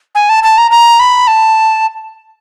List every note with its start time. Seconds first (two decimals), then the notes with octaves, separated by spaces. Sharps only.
0.15 G#5
0.29 A5
0.43 A5
0.58 A#5
0.71 A#5
1.00 B5
1.27 A5